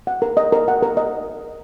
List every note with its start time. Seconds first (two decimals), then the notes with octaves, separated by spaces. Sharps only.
0.07 F#5
0.22 A#4
0.37 D#5
0.52 A#4
0.68 F#5
0.83 A#4
0.97 D#5